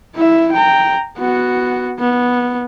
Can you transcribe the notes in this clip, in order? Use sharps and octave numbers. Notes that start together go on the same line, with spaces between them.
E4 E5
G5 A#5
B3 F#4
B3